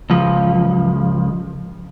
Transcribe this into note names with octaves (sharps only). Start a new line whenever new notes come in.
C#2 F3